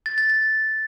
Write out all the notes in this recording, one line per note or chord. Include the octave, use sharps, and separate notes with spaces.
A6
A6
A6